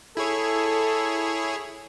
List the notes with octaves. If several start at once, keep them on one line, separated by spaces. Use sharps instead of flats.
E4 G#4 A4 C#5